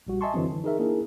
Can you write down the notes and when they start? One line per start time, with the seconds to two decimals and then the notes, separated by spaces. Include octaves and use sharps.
0.07 A#1 G3 F#4
0.21 D#5 E5 G#5 A5 C6 C#6
0.34 F#2 D3 E3 F#3 C4
0.48 D3 E3
0.64 D#4 G#4 A#4 E5
0.79 A#3 D4 E4 G#4 A#4